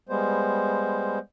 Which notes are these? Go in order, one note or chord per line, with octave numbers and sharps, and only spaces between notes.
G3 G#3 B3 C5